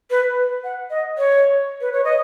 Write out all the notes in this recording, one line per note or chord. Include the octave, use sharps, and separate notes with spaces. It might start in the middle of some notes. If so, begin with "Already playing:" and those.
B4
F#5
D#5
C#5
B4
C#5
D#5